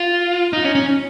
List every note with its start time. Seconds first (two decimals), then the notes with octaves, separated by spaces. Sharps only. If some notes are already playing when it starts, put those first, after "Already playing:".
Already playing: F4
0.53 D#4
0.64 C#4
0.75 C#4